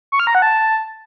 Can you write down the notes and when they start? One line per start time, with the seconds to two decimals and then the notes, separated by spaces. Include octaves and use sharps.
0.12 C#6
0.20 F6
0.27 A#5
0.35 F#5
0.42 A5